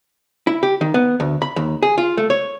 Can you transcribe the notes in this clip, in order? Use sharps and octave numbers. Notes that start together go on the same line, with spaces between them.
E4
G4
D#3
B3
D2
B5
D#2
G#4
F4
A3
C#5